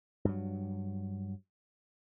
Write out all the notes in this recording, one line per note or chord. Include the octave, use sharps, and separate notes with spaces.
G2 F#3